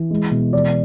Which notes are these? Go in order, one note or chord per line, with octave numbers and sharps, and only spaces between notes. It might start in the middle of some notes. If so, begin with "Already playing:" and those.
Already playing: E3
G#3
B2
E3 D5